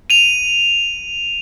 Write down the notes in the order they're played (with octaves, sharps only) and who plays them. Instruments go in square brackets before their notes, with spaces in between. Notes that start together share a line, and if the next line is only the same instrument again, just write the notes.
[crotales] D#7 F7